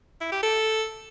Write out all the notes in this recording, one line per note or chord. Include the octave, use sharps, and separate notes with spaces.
E4
G4
A4